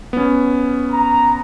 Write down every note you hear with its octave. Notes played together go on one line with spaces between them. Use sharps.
B3 C#4
A#5